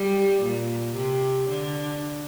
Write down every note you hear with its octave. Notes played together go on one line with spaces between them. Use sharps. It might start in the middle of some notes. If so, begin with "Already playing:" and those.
Already playing: G3
A#2
C3
D3